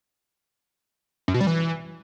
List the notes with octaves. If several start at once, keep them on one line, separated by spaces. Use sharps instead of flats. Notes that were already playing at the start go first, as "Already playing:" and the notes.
F#2
B2
G3
E3